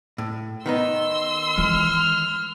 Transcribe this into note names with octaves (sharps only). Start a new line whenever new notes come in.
A2
D#3 B3 D#4 C6 E6
E3 G#3 F6